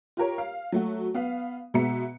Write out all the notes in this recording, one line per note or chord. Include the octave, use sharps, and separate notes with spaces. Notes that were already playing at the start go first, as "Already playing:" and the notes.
F4 G4 A#4 C#5
F5
F#3 A3 F#4
B3 F5
B2 G#3 B3 E5 A#5 C#7